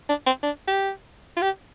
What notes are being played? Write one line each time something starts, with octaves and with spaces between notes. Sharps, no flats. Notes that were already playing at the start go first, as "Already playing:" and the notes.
D4
C4
D4
G4
F4
G4